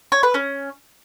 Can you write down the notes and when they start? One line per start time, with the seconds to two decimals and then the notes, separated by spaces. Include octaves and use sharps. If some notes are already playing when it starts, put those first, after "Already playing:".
0.12 C#5
0.23 B4
0.34 C#4